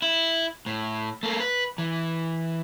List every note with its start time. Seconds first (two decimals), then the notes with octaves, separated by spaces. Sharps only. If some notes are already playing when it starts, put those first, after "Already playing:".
0.02 E4
0.66 A2
1.23 A3 A#3
1.40 B4
1.78 E3